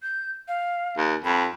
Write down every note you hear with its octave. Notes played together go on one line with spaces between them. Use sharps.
G6
F5
D#2
F2 B5